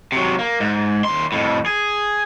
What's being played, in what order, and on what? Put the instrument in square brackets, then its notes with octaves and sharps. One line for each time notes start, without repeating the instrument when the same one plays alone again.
[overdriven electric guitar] C3 F#3
A#3
G#2
D#2 C6
F2 A2
G#4